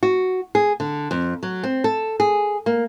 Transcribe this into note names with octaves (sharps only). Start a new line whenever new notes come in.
F#4
G#4
D3
F2
F#3
C4
A4
G#4
A#3